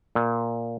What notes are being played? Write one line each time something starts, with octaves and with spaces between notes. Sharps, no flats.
A#2